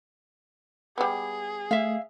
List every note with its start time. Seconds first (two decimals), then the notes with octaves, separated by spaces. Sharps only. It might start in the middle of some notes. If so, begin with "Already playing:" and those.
0.98 G3 B3 G#4
1.71 A3 E5 F5